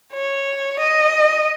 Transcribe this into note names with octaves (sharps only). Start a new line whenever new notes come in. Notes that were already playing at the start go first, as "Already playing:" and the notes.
C#5
D#5